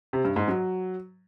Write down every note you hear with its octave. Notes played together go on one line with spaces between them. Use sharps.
C3
G2
G#2
F#3